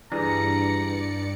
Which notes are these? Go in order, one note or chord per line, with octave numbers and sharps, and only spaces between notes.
G2 E3 G3 D4 G#4 D5 A#5 C#7